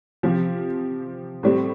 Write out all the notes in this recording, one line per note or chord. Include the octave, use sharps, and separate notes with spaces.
C3 F3 C4 G4
A2 G3 C4